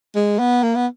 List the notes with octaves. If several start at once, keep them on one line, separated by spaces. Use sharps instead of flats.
G#3
B3
A#3
B3